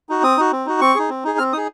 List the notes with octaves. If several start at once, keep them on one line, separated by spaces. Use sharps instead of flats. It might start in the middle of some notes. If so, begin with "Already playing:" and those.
D#4 F#4
C4 D#6
D#4 F#4
C4
D#4 F#4
C4 C#6
D#4 G#4
C4
D#4 G#4
C4 F6
D#4 G#4 D#6